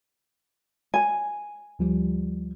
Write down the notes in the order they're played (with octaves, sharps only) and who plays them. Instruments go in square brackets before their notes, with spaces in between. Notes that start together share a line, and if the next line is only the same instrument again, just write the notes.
[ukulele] G#5
[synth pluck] D2 F3 G3